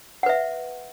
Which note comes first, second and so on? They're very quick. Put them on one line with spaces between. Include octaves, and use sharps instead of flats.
F#5 B4 E5